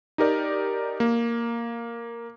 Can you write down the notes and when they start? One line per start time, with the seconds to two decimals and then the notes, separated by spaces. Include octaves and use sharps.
0.18 D#4 G4 A#4 D5
1.00 A#3